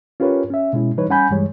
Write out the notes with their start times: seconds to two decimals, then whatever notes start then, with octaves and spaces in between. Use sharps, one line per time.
0.20 C#4 F4 G4 A#4 B4 C#5
0.50 C#4 E5
0.73 B2 G#3 C#4 E4
0.97 E3 G3 D#4 B4 C#5
1.09 G3 C#4 F#5 G#5 B5 G6
1.30 G2 E3 G3 G#3 C#5